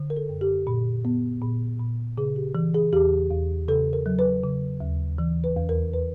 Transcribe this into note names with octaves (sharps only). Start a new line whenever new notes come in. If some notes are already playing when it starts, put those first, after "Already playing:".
Already playing: D3
A#4
A4
F#2
G4
A#2
B3
A#2
A#2
C#3 G#4
G4
E3
G#4
E2 G4
E2
C#3 A4
A#4
F#3
B4
C#3
D#2
E3
B4
E2
A#4
B4